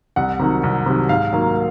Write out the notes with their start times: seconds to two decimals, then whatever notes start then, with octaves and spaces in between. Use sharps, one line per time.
0.16 C2 F#5
0.39 C3 D#3 F#3
0.63 C2
0.86 C3 D#3 F#3
1.09 G#2 F5
1.32 D#3 F#3 A#3